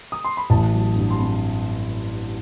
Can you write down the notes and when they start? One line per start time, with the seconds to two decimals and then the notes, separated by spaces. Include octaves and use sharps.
0.12 D#6
0.25 C6
0.37 B5
0.50 A1 A5
0.73 F#3
0.96 G2
1.11 C6
1.18 C4 B5